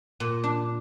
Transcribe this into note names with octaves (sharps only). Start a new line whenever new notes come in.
A#2
D4